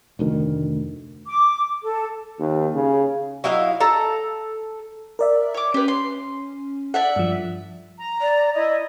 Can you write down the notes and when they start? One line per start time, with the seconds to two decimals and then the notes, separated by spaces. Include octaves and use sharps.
0.19 F1 D2 D#3
1.27 D6
1.83 A4
2.39 D#2
2.74 C#3
3.44 F#3 E4 D#5 F5
3.81 A4 A#5
5.19 A#4 D5 E5
5.54 C#5 D6
5.74 C#4 G4 B4
5.88 C6
6.94 A4 D5 E5 F#5
7.16 G2 F3
7.98 A#5
8.21 D5
8.54 E4 D5 D#5